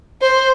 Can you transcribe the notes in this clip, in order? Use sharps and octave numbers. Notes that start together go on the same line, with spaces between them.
C5